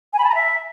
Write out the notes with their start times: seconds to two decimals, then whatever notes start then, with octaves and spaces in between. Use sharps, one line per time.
0.13 G#5
0.18 B5
0.24 A5
0.29 A#5
0.34 E5